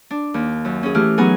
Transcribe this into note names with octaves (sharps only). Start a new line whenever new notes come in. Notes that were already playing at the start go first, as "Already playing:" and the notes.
D4
D#2
F#2
C#4 G#4
E3 A3 E4 G4 F6
F#3 B3 D#4 G#4 G#5